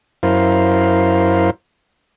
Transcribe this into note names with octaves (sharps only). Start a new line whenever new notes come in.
F#2 E4 A#4 C5 F5